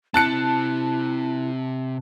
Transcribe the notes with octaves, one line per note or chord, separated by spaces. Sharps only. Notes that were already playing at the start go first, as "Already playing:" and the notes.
C3 C4 E4 A5 F#6 C#7